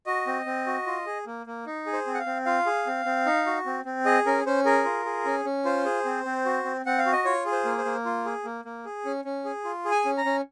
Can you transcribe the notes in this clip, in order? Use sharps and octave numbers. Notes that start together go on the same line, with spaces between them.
F#4 D#5
C4
C4
F#4
F4
G#4
A#3
A#3
D#4
G#4
C5
C4
F#5
F5
C4
F4 F5
G#4
C4
C4
D#4
F#4
C4
C4
G#4 D#5
C#4 A#4
C#4 C5
G#4 A#4
F4
G#4
C#4
C#4
F4 C5
G#4
C4
C4
F#4
C4
C4 F#5
F5
F#4
D#5
F4 C#5
G#4
C5
A#3
C5
A#3
F4
G#4
A#3
A#3
G#4
C#4
C#4
G#4
F4
G#4
G#5
C#4
A#5
C#4